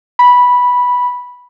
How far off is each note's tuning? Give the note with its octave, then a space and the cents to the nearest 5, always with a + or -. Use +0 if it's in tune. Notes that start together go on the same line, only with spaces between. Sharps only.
B5 -10